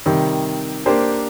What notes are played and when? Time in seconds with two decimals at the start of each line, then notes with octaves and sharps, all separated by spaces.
0.06 C3 D#3 G3
0.86 A#3 D4 G4 C5